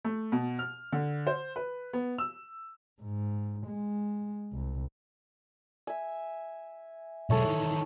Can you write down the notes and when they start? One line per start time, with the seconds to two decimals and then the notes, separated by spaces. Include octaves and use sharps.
0.05 A3
0.32 B2
0.59 F6
0.92 D3
1.27 C5
1.56 B4
1.93 B3
2.18 E6
3.02 G#2
3.67 G#3
4.52 C2
5.87 E5 G#5
7.30 B1 G#3 A4 C#5 E5
7.44 D#3 E3